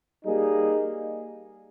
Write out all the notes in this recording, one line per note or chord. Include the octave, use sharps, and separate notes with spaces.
G3 A#3 D#4 G#4